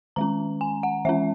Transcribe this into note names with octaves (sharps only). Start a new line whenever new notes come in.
D#3 G#3 C#4 A#5
G#5
F#5
E3 G#3 C#4 E5